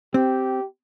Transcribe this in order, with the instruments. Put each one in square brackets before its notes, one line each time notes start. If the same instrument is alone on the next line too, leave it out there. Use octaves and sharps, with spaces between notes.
[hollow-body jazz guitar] C4 [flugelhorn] G4